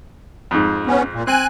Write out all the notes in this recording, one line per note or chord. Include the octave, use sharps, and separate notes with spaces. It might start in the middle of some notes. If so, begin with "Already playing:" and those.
F2 G#2
B3 C#4
A#2
C4 G#5 F#6